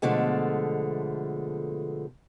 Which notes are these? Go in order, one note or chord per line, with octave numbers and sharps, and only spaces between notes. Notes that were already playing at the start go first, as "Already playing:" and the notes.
B2 D3 F3 G#3 A3